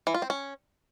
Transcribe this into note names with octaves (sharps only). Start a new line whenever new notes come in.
E3
F4
C4
C#4